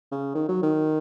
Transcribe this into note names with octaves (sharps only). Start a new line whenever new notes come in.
C#3
D#3
F#3
D#3